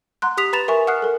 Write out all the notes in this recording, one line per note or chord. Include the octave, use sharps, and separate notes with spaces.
F#5 A#5 C6 F#6
G4 D#6 B6 F7
B4 A#5 B5 A6 E7 F7
A#4 E5 G#5 C#6
F#5 D#6 F6 F#6 C7
A4 A#4